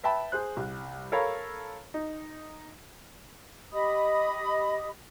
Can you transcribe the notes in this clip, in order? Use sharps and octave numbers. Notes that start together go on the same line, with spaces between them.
B4 E5 G5 A5 B5
G#4 C5 F#6
C2
A4 A#4 C#5 F5 B5
D#4
G4 D#5 B5 D#6